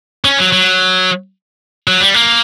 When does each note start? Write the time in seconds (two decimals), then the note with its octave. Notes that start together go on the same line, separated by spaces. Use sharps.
0.25 C#4
0.38 F#3
0.52 F#3
1.87 F#3
2.01 G3
2.14 A#3